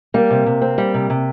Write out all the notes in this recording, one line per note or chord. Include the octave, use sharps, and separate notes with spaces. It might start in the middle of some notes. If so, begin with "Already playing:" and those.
G3 A#3
C3
C3
C4
G3
C3
C3